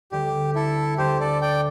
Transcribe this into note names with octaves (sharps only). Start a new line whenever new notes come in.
D2 D3 G3 D4 G4
E4 A4
D2 D3 G3 D4 G4 C5
A4 D5
D5 G5